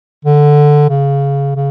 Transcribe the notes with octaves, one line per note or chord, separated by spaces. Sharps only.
D3
C#3
C#3